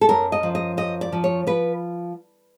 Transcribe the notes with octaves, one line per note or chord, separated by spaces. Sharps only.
A4
F#2 A#4
D#5
F3
D#5
F#2 D#5
D5
F3
C#5
F3 B4